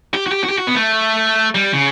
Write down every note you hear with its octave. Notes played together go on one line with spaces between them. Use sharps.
G4
F#4
G4
F#4
G4
F#4
B3
A3
G3
C#3